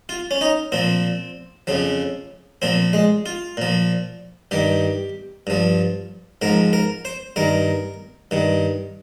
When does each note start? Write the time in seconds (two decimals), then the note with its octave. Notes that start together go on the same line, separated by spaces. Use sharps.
0.09 F4
0.31 C#4
0.41 D#4
0.72 A#2 F3 C4
1.67 F2 C#3 F3
2.62 A#2 F3 C4
2.93 G#3
3.26 F4
3.57 A#2 F3
4.51 G2 D#3 G4
5.47 G2 F3
6.42 G#2 F3 A#4
6.73 A#4
7.05 C5
7.36 G2 D#3 A#4
8.31 G2 D#3